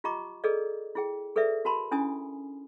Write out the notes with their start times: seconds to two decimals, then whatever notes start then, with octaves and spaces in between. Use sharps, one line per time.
0.04 F4 G4 D#5 A#5 C#6 D6
0.44 G#4 A4 B4 D5 D#5
0.95 E4 G#4 G5
1.36 G#4 A4 B4 D5 E5
1.65 F#4 A#4 A5 B5 C6
1.91 C#4 D4 E4 G#5 D#6